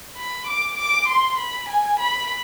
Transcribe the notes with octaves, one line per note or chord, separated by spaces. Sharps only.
B5
D6
D6
C6
B5
G#5
B5